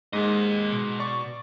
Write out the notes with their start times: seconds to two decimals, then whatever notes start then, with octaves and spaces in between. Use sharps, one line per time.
0.13 G#2 G#3 A#3 D#5
0.73 B2
0.99 D5 C#6